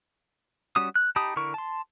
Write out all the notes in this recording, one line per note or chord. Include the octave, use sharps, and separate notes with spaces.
G3 C#4 F#4 D#6
F#6
D#4 G4 A5 B5 D#6
D3 E4 A#4 C#6
A5 C6